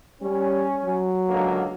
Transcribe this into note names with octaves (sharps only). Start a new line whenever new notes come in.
G3 C#4
F#3
C#2 D3 A#3